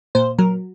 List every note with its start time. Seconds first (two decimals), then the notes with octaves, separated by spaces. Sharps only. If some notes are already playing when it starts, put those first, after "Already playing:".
0.15 A#2 C5
0.38 F#3 A#4